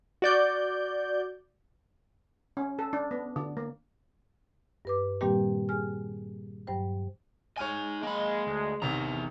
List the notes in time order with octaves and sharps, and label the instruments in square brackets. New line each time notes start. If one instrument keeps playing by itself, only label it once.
[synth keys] F#4 D5 G6
[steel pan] C#4
A4
D4
B3
D3
A#3
[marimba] G2 B4 D6
A#2 D#3 G3 A#3 C4 G4
G#4 G#5 F6
G2 F#3 C5 G5
[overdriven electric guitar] D#4 G#5 [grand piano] C#5 F6 D#7
[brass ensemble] G#3 [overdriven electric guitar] A#3 B5
[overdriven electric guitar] D2
[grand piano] A1 C3 D#3 [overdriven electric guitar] E2 A#5